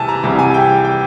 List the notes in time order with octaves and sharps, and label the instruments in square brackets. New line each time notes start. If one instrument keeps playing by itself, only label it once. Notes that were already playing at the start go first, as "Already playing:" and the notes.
Already playing: [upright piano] C3 E3 G3 G#5 A5
A#5
C2 C3 E3 G3
G#5
G5
G5